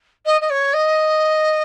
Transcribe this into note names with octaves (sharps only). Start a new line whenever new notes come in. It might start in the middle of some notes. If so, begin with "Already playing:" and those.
D#5
D#5
C#5
D#5